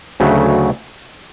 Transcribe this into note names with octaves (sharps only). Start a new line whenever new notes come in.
D2 C#3 F#3 A3